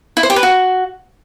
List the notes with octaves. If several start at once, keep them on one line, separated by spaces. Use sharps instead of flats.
E4
C5
G4
B4
F#4